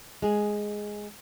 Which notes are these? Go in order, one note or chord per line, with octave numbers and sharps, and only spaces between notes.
G#3 G#4